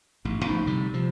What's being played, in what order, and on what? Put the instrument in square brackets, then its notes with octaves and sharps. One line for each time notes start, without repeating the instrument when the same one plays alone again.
[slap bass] A1 G#2
[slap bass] A2 D3 F3 [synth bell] D#4 B5
[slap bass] C3 G3
C3 F3